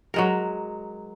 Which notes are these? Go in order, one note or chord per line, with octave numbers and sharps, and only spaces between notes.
F#3 G#3 A#4